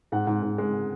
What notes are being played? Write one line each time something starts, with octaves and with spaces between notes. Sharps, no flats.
G#2 F#5
G#2
G#2
G#3